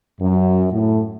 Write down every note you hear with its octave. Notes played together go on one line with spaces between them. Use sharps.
F#2
A2